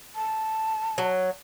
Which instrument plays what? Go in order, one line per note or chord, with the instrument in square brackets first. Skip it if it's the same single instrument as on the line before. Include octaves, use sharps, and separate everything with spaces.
[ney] A5
[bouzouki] F#3